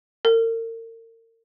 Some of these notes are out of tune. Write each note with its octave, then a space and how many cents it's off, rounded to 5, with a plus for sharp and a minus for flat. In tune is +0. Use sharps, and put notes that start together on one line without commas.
A#4 -40